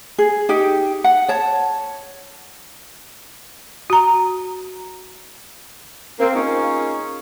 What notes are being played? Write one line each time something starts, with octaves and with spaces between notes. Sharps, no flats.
G#4
D#4 G4 G5
F#5
C#5 A5
F#4 A#5
A#3 C4
A#3 C#4 D#4 F4 G#4